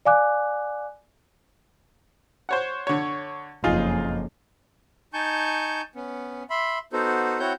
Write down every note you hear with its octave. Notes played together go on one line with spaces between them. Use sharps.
D5 F5 G#5 D6 F#6
C5 C#5 F#5
D3 C#5
F#1 F2 D#4 F4 G#4
D#4 G#5 A5 C#6 G6
B3 C#4
E5 B5 C6
B3 D#4 F#4 A4 C5
C4 E4 F#4 C#5 F#5 G6